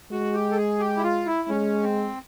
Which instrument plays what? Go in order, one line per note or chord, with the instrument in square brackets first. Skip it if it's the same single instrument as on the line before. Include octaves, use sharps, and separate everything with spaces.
[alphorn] G#3 [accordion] F#4
[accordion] G4
A4
G#4
G4
E4
F4
E4
[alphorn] G#3 [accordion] C#4
[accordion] C4